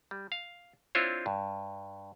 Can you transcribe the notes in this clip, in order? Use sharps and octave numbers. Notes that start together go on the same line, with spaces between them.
G3
F5
C4 D4 E4 F4 C5 C#5
G2